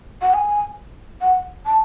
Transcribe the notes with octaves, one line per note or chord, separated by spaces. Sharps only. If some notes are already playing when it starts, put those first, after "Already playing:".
F#5
G#5
F#5
A5